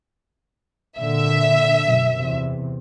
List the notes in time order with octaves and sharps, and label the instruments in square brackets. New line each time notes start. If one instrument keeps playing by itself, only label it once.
[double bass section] A#2 D3 [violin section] E5
[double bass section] F#2 B2
E2 C3